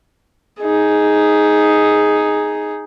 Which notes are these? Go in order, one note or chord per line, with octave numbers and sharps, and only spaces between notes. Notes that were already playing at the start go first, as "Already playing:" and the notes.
D#4 G#4